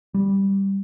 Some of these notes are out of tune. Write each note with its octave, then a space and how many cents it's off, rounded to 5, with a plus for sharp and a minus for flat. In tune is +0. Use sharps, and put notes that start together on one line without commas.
G3 +0